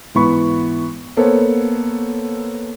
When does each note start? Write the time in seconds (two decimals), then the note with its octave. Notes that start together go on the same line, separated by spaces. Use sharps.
0.15 G#2 E3 B3 B5 C#6
1.17 A#3 B3 A4 C5 C#5